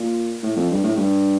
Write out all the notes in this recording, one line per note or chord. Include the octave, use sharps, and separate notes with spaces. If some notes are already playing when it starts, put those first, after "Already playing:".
Already playing: A#2
A2
F2
G2
A2
G2